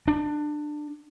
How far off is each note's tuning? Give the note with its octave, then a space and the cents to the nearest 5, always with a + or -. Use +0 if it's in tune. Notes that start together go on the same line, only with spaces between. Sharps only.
D4 +20